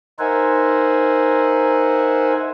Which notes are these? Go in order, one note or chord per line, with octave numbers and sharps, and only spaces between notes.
D#4 A#4 C5 E5 F#5 G#5